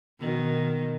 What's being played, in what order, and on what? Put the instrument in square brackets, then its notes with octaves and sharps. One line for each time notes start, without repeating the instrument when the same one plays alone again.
[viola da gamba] B2 D#3